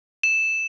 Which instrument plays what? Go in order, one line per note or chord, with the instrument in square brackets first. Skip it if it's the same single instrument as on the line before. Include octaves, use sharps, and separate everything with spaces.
[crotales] E7